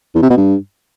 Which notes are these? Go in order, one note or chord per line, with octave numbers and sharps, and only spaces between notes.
E2
C3
B2
G2